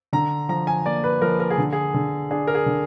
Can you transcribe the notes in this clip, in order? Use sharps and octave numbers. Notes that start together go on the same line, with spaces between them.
D3 A#5
F3 A#5
G#5
A#3 D5
B4
F3 A#4
A#4
G#4
D3
G#4
D3
D4 G#4
A#4
G#4
D3